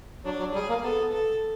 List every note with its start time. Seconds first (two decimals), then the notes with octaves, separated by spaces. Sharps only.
0.25 F#3 D4
0.39 F#3
0.54 G3 G#4
0.69 A#3
0.83 B3 A4
1.12 A4